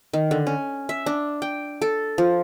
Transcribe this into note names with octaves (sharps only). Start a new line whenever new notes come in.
D#3
D3
C#4
E5
D4
G5
A4
F3